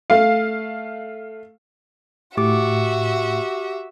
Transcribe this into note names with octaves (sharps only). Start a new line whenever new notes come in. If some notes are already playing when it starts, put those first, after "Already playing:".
A3 F5
A2 F#4 G4 E5 D6